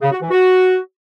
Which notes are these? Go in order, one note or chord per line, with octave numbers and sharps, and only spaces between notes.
C#3
F#4
E3
F#4